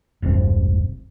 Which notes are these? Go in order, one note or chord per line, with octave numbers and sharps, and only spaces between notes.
E1 C2 G2 C4